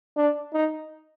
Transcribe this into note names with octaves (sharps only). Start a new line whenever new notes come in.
D4
D#4